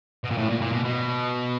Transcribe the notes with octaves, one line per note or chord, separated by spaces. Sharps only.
B2
A#2
A2
A#2
A#2
B2
B2